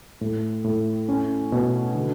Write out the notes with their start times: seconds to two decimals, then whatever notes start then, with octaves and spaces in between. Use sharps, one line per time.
0.21 A2
0.64 A2
1.09 C#4
1.52 B2
1.95 D3